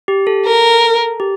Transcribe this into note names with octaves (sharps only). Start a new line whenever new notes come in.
G4
A4
A#4
G4